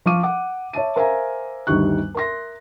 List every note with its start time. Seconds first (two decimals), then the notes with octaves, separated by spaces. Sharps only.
0.06 F3 F5 C#6 D6 D#7
0.23 F#5 D6
0.73 C#5 E5 A5 D#7
0.96 A#4 C5 E5 F5 G#5 A#5
1.67 G1 D2 D#3 G3 C#6 F#6
2.15 A#4 E5 C6 A#6